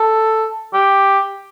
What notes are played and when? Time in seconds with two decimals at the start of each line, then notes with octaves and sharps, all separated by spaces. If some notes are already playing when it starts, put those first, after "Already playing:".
Already playing: A4
0.74 G4